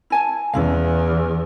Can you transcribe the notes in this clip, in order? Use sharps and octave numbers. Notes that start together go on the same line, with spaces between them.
E4 G#5 A5
E2 C#4 E4 F5